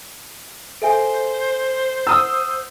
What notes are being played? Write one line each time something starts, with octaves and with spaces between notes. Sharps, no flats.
A4 C5 E5 G#5
F#5 D#6 E6